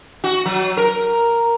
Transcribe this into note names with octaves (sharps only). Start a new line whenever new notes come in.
F#4
F#3
A#4